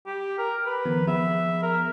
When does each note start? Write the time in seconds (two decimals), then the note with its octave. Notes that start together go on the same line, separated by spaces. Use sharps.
0.06 G4
0.38 A#4
0.66 B4
0.86 D#3 F3 B3
1.07 F3 B3 G#4 E5
1.62 A#4